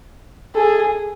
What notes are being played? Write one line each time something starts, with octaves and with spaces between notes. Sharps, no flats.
G#4 A4